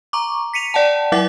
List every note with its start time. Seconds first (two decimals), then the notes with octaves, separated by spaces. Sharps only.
0.13 A#5 C#6 D6
0.54 B6 C#7 D#7 F7
0.74 D5 F#5 G5 A5
1.12 F#3 E4 E5 F#5 D6 A6